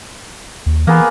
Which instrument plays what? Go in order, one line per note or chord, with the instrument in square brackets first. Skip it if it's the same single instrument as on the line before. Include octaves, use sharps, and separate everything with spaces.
[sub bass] D#2
[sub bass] E3 [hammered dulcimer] A#3 B3 G#4